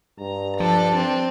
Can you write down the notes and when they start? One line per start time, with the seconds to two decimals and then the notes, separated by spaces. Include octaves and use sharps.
0.20 G2 A#5
0.60 F3 D4 A4
0.94 C4